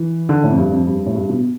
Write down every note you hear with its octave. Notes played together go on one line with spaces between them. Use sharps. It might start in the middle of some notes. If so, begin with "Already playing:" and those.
Already playing: E3
D3
A2
F2
G2
F2
G2
A2
G2
B2